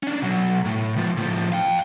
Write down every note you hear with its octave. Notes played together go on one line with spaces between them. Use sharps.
C#4 D4
B2 F#3
A2
C#2 F3
A2 F3
F5 G5